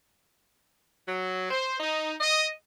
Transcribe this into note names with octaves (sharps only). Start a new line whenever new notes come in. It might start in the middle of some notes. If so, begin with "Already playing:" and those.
F#3
C5
D#4
D#5